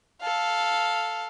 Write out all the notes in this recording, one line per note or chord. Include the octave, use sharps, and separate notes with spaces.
A4 F5